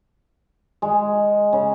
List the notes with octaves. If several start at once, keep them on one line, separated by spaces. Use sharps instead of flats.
G#3
C#3